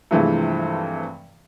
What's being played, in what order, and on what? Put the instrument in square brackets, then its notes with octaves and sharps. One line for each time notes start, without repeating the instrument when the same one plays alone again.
[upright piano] G2 C3 E3 F3 G#3 A3